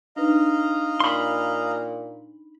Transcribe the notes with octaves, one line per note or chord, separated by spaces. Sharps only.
D4 D#4 B4 D#5 F5 A#5
A#2 B5 C6